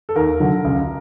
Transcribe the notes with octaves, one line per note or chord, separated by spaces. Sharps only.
A4
D#2 A#4
D3 F#3
C#2